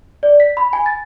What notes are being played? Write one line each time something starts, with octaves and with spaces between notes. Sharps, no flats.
D5
B6
B5
G#5
A6